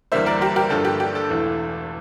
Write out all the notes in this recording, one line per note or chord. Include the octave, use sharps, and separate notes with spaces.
E2 D3 G3 A#3 C5 E5
A#4 D5
G4 A#4
G4 A#4
G1 G2 D3 F3 A#3 A4
G4
G4
A4
E1 E2 E3 A3